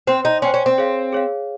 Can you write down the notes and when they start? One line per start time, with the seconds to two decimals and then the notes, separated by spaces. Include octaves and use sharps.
0.07 C4 C5 G5 C6
0.25 D#4
0.42 C#4 C6
0.45 C5 G5
0.54 C#4
0.66 C4
0.78 G#4 C#5 F5
1.12 G#4 C#5 F5